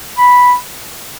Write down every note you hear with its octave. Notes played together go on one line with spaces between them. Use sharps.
B5